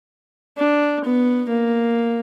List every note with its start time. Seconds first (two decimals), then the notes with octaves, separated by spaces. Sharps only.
0.58 D4
1.04 B3
1.49 A#3